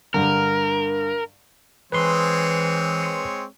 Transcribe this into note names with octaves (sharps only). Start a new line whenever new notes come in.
G2 D3 A#4
E3 G#3 C4 B4 C#5 C6 D#6